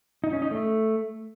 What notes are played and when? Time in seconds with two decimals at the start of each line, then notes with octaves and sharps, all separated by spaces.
0.24 D#4
0.33 C#4
0.42 D#4
0.51 A3